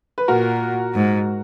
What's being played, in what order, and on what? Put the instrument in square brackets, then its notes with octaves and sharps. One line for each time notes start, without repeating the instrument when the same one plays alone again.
[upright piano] B4
[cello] A#2 [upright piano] F#4 A#4
[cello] G#2